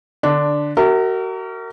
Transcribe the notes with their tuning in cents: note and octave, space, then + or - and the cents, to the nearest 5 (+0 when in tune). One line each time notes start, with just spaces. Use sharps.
D3 +10 D4 +0
F#4 +35 A#4 -25 E5 -5